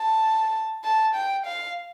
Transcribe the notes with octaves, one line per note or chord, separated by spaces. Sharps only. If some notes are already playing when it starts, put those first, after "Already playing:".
Already playing: A5
A5
G5
F5